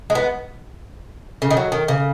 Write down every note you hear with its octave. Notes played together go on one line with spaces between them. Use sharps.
G#3
B3
C#3
D#3
F#3
D#3
C#3